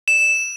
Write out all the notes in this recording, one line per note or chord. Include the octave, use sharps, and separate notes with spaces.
E7